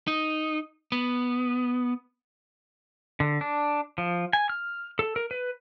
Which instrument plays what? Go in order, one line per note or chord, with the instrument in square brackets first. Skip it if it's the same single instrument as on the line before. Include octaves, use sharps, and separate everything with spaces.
[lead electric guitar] D#4
B3
[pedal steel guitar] D3
D4
F3
G#5
F6
A4
A#4
B4